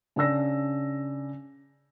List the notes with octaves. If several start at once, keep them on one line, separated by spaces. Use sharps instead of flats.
C#3 D4 D5 E6 A#6